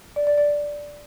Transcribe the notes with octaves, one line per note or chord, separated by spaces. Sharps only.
D5
D5
D5